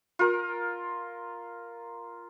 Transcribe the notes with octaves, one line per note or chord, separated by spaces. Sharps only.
F4 A#4